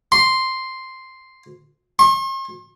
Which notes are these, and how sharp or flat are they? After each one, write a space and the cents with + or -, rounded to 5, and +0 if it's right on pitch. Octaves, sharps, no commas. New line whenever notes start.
C6 +0
C6 +45